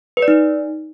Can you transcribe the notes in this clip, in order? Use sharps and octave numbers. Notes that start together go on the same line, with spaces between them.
B4
D5
D#4